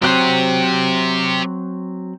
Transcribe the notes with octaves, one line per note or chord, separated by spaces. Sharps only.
F#3 C4 G4 C5 F#5